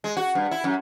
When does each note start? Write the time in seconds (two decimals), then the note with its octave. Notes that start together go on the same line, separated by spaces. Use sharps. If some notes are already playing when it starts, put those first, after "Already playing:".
0.04 G#3
0.17 F#4
0.35 G2
0.51 E4
0.64 F#2